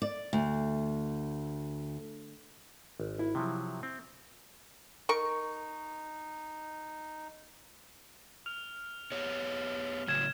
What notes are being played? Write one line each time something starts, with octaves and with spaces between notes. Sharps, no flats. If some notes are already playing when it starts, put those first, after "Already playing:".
D5
D2
G#1
E4
C3 F3 F#3
C4
D#4 A#4 C#6
F6 F7
B3 G4 C#5
A2 C#3 F#3 F6 G#6 E7